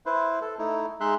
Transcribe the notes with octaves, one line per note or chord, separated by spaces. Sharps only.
E4 B4 C5
A4
A3 D#4 E4
G#3 D#4 E5 C6 F#6